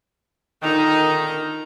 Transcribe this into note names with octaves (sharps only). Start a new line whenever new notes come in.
A#2 D3 D#3 D#4 A#5